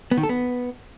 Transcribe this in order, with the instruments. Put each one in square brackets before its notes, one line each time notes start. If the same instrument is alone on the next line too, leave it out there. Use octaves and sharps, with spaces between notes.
[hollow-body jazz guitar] B3
D#3
A4
B3